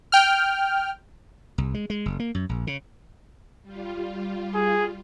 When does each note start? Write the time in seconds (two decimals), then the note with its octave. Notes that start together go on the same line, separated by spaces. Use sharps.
0.12 G5 F6
1.58 C2
1.74 G#3
1.90 G#3
2.06 F#1
2.20 A#3
2.35 F#2
2.49 A#1
2.67 C#3
3.63 G3 F4
4.54 G#4